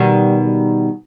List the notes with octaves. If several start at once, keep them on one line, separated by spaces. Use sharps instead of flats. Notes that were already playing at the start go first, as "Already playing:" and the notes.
Already playing: B2 D#3 G3
G3